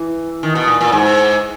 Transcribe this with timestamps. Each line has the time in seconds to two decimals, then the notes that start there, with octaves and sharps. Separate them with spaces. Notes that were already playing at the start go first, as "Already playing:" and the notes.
Already playing: E3
0.43 D#3
0.55 B2
0.67 A#2
0.81 A#2
0.92 G#2